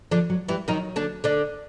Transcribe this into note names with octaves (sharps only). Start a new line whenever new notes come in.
D3 F3 D4
F#3
E3 G3 E4
D#3 F#3 D#4
D3 D4
D3 D4